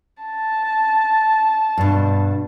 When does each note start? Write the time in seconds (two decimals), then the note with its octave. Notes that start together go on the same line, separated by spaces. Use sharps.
0.22 A5
1.77 G2 B2